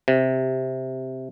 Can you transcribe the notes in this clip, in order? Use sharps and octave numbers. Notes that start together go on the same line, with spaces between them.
C3